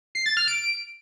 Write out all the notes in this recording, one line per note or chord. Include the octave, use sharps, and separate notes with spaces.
C7
A6
F6
D7